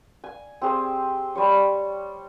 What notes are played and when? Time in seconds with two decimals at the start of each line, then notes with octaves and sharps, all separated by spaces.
0.24 G#5
0.62 C4 G4 G#4 C5
1.35 G3 C5 C#5